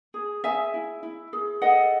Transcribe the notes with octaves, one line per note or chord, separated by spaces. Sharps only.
G#4
G#4 E5 G#5
E4
E4
G#4
A4 D#5 F#5